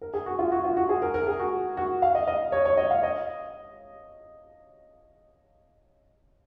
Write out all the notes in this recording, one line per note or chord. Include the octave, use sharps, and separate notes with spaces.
A#4
G#4
F#4
F4
F#4
F4
F#4
G#4
A#4
A#4
G#4
F#4
F#4
F5
D#5
D#5
C#5
C#5
D#5
F5
D#5